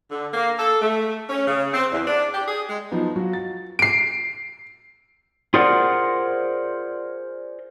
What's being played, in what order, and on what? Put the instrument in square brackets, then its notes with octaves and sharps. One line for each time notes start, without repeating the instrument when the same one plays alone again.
[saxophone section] D3
A#3
A4
A3
C#4
C#3
C4
E2
D4
G4
G#4
G#3
[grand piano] F3 F#3 B3 D#4
F#3 F4 F#4
A6
[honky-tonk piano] C7 D7
[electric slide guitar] F4 G#4 A#4 C5 D5 F#5